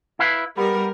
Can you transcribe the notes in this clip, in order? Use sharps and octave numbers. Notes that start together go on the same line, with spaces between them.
E4 B4 F5
G3 B3 A#4